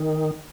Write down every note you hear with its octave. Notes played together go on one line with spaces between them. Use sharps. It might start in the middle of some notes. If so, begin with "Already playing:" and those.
Already playing: D#3